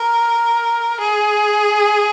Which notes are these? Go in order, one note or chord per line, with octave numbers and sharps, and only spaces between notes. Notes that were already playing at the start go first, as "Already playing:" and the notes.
Already playing: A#4
G#4